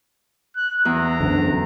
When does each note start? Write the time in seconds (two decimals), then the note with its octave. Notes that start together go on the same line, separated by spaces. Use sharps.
0.56 F#6
0.85 E2 A#5
1.21 F#2 D3